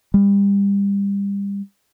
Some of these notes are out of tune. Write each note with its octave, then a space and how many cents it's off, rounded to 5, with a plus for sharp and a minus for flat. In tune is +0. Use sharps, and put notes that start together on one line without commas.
G3 +30